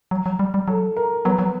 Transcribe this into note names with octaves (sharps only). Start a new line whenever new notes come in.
F#3
F#3
G3
G3
F#3 A4
A#4
F#3 B3 B4
F#3